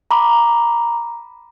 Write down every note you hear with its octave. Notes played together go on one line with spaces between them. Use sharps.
A#5 B5 D6